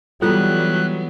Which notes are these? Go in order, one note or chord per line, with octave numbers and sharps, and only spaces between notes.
E3 F#3 G3 B3 E4 F4 A4 F#6